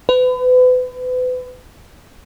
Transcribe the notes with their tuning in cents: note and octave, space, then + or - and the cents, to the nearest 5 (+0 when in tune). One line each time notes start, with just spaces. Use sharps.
B4 +35